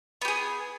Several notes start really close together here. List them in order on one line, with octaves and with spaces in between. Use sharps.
B3 G4 G#4